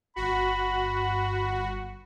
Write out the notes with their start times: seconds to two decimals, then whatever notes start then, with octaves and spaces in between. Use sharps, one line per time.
0.16 G1 F#4 B5